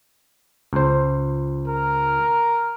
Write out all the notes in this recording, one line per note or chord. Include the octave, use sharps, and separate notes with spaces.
C#2 C5
A#4